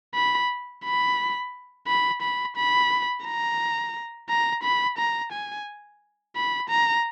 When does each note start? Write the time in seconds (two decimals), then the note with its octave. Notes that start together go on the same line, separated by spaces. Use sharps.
0.15 B5
0.85 B5
1.87 B5
2.22 B5
2.56 B5
3.25 A#5
4.29 A#5
4.63 B5
4.98 A#5
5.32 G#5
6.36 B5
6.69 A#5